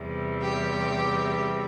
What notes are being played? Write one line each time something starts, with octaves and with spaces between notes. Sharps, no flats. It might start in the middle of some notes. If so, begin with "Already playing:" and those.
Already playing: E2 C3 G3
G4